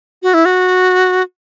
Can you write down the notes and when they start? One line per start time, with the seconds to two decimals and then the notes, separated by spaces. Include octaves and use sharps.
0.23 F#4
0.34 E4
0.45 F#4